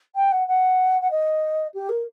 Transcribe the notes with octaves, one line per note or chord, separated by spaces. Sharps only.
G5
F#5
F#5
F#5
D#5
G4
A#4